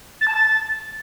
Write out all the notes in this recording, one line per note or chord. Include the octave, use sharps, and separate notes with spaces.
A6
A5
A6